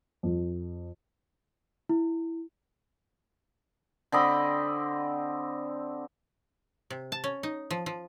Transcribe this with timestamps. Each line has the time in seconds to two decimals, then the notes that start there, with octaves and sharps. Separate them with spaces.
0.23 F2
1.89 E4
4.12 D3 C4 D#5 B5
6.90 C3
7.12 A5
7.24 C#4
7.43 D#4
7.71 F3
7.86 F3